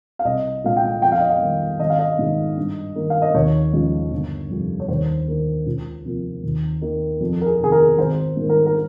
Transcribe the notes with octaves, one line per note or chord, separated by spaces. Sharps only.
F5
C2 D#5
A#2 G#3 F5
G5
F2 G5
F5
D#5
F5
D#3 G3 A#3
G#1 D#5
F5
D#5
G#2 D#3 G#3
G2
D#3 A#3
F5
D#5
D#2 C#5
C#3 F3 G#3
G1
F2 C3 G3
C#5
D#2 C5
D#3 A#3
C#2
C3 F3 A#3
D#2
D#3 A#3
F2
A#4
G#4
C3 D#3 G#4
A#4
G#1 C5
G#2 D#3 G3 A#3
A#4
A#4